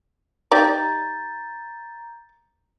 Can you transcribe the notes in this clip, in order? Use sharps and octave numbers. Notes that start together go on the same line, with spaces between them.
D#4 G4 D5 A#5 G6 A6